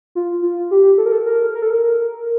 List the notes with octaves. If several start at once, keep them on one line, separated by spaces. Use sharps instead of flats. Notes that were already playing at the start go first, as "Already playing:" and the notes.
F4
F4
G4
A4
A#4
A4
A#4
A#4
A4
A#4